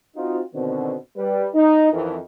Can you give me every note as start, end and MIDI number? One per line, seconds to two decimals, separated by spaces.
0.16 0.41 60
0.16 0.41 63
0.16 0.41 65
0.16 0.41 66
0.54 0.95 47
0.54 0.95 50
0.54 0.95 51
0.54 0.95 60
1.17 1.48 55
1.17 1.48 71
1.55 1.90 63
1.92 2.17 41
1.92 2.17 51
1.92 2.17 52
1.92 2.17 75